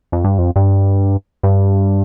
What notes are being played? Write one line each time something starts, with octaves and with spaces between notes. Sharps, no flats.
F2
G2
F2
G2
G2